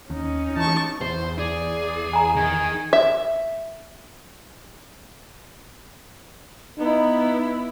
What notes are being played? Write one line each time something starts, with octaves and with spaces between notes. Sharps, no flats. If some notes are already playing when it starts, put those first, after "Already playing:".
D#2 C#4 D#4
E3 A5 C#6
E2 C5
G#4 D5
G#5 A#5
D#3 G#4
E5
B3 D#4 E4